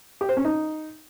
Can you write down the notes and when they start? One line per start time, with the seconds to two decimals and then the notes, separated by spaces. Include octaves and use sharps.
0.21 G4
0.29 C5
0.37 C#4
0.45 D#4